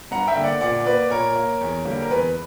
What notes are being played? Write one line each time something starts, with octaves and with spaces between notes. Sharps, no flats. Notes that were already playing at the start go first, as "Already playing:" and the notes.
G2 F#5 A#5
E5 G5
D3 A#3
D5 F#5
A#2 D5 F#5
A#3 B4 D5
A#2 A#4 C#5
A#3
E2
D3 G3 A#3
A#4
E2 B4